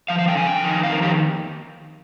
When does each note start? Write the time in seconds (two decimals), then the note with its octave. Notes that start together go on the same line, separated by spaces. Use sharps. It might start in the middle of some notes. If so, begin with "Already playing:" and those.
0.08 F3 F5
0.19 F5
0.28 D3 G5
0.37 G#5
0.47 F2 G5
0.64 D#3
0.83 F2 F5
0.92 A#4
1.01 D#3 G4